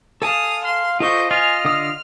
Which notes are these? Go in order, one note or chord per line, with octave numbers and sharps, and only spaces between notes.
A4 F5 G#5 A5 D#6
F5 C6
F4 A4 C5 D#5 C#6 G6
F4 D#5 G#5 F6
D3 D#6 E6